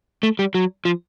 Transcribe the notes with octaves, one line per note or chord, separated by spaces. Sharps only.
A3
G3
F#3
F3